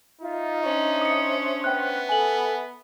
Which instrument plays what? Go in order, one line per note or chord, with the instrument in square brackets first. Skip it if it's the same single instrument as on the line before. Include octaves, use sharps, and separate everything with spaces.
[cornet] D#4 [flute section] F4 E5
[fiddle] C#4 [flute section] D4 C5 E5
[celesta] D#6 C#7
[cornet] B3 [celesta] G5 F#6
[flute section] A4 E5 [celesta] G#5 F#7